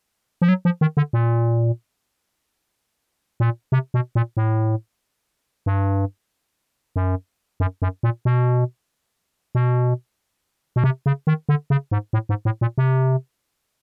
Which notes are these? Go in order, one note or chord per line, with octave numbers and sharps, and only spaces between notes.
F3
F#3
F3
D#3
D3
A#2
A#2
C3
B2
A#2
A2
G2
F#2
F#2
F#2
A#2
B2
B2
B2
C3
C#3
D#3
D3
C#3
G#2
A2
G#2
A2
A#2
C3